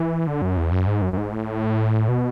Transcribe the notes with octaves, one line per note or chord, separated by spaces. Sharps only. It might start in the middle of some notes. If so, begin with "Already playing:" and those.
Already playing: E3
D3
F#2
E2
F#2
G#2
F#2
F#2
G#2
A2
B2